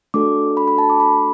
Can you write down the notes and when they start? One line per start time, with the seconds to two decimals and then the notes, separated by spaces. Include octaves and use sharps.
0.14 A3 D4 F#4 A4 D6
0.57 B5
0.68 B5
0.78 A5
0.90 D6
1.00 B5